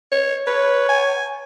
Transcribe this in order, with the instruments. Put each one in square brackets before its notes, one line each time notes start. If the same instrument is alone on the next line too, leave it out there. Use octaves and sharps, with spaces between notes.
[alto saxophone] C#5
[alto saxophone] B4 [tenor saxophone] C#5
[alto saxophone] G#5